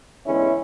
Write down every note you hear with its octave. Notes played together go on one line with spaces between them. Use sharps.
E2 D3 G#3 B3 C#4 E4